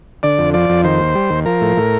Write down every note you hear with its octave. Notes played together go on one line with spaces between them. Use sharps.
D3 D5
F2
F3 D5
F2
D#3 C5
D#2
G3
D#2
F3 A#4
A2
A2